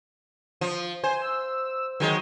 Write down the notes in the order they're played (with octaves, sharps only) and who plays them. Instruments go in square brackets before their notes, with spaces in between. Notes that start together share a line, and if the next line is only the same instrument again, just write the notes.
[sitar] F3
[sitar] C5 [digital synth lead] G#5
[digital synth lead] E6
[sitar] D#3 G#3 [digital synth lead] F#3